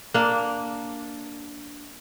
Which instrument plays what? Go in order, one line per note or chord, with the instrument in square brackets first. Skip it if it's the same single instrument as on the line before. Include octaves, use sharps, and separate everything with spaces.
[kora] A#3 D4